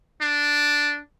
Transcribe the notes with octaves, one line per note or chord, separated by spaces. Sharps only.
D4